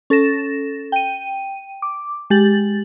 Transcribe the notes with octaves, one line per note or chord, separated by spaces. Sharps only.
C#4 A4 A6 A#6 E7
G5 D#7
D6
G#3 G4 A6 F#7